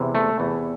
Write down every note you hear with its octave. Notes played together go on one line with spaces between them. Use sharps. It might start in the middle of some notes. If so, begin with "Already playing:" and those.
Already playing: E2 C3 E3
A3
E2 C3 E3